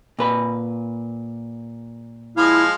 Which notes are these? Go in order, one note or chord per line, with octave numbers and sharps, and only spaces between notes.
A#2 B4 B5
F3 G#3 E4 F5